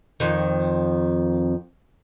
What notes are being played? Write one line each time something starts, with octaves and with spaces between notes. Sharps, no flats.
F2 D#3